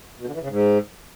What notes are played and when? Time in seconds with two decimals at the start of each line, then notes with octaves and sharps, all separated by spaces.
0.20 B2
0.27 D3
0.34 E3
0.41 C#3
0.48 G#2